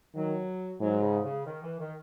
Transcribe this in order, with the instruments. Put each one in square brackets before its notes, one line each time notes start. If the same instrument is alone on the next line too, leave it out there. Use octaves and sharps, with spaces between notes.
[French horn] D#3 [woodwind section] F#3
[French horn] G#2 [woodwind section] F#3
[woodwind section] C#3
C#3
D#3
E3
D#3